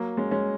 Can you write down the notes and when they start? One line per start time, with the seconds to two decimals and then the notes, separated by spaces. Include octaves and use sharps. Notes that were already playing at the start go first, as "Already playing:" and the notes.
Already playing: F#3 A#3
0.17 G#3 C#4
0.31 G#3 C#4